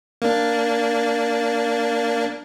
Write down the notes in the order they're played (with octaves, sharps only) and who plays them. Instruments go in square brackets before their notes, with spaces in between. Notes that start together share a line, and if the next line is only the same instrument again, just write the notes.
[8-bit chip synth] A#3 D4